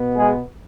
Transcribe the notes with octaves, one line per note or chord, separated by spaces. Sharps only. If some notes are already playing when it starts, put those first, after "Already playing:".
Already playing: B2 B3
G#3 G#4